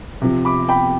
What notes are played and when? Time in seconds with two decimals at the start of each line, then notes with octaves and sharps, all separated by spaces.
0.21 C3 F3
0.45 B5 D6
0.69 G5 B5